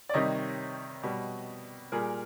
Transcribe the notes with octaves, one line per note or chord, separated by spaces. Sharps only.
D5
C3 D#3 G3 C#5 D#5
B2 G3
A#2 G3 G#4 A#4